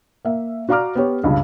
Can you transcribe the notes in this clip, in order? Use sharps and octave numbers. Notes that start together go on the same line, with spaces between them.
A#3 E5
F#4 D5 F5 A#5 D6 F6
B3 G4 C#5
C#2 G2 C#3